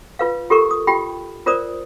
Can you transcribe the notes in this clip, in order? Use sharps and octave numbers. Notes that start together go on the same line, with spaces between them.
F4 B4 F5
F4 G4 A4 A#4 C#6
D#6
F4 G4 G5 B5
F4 A#4 C5 D5 D#6